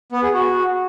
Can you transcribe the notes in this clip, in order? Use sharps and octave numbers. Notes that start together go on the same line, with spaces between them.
B3
G#4
F#4